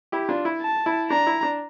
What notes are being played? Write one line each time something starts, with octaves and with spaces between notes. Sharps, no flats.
E4 G4
D4 F4
E4
A5
E4
D4 A#5
E4
D4